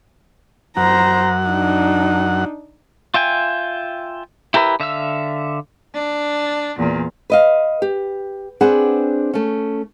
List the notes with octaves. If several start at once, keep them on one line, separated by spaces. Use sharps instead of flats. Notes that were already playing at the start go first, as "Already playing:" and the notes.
F#2 C5 F#5 A#5
D4 D#4
F4 E5 G5 G#5
E4 G4 A#4 B4 E5
D3 E5 F5 E6
D4
E2 A#2
B4 D#5 F5
G4
C4 D4 G#4 B4 C5 F#5
A3 C#4